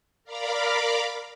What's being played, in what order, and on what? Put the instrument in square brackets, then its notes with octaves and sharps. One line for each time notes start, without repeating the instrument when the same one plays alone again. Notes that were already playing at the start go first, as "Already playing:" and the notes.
[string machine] A#4 D5 F5 A#5 B5 D6